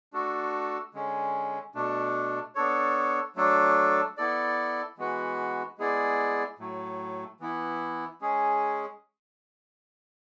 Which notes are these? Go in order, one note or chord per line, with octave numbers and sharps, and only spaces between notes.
A3 D4 F#4 A4
D3 G#3 C#4
B2 A3 D4
B3 D4 A4 C#5
F#3 A3 D4 A4
B3 E4 A4 D5
E3 G#3 B3 F#4 B4
G#3 B3 E4 G#4 D5
A2 F#3 A3
E3 B3 E4
G#3 C#4 G#4